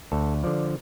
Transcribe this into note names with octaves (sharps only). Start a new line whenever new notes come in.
D2 A4
D3 F3 D5